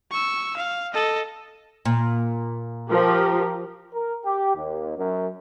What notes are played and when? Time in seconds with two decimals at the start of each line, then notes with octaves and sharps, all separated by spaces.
0.11 C#6 E6
0.56 F5
0.94 A4 D#5
1.85 A#2
2.90 F3 G4 A#4
3.94 A#4
4.25 G4
4.55 D#2
4.97 F#2